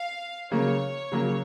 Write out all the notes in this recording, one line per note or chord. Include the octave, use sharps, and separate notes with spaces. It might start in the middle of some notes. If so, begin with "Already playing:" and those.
Already playing: F5
C#3 F#3 A#3 C#5
C#3 F#3 A#3